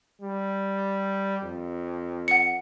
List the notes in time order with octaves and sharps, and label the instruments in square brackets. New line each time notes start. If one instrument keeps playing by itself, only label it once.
[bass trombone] G3
F2
[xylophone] F#5 C#7